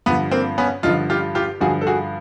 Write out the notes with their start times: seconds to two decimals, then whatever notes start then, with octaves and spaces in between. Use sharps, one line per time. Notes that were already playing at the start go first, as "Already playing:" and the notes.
0.06 G2 D3 F3 B3
0.31 A#3 C4
0.58 B3 C#4
0.83 G2 D3 F3 D#4 F4
1.10 F4 G4
1.35 F4 G4
1.60 G2 D3 F3 F#4 G#4
1.81 A4
1.87 F#4 G#4